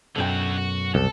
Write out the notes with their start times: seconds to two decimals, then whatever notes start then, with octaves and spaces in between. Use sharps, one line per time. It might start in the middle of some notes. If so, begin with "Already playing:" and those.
0.16 B1 F#2 D3 F#4 G5
0.58 F#4
0.95 C2 A4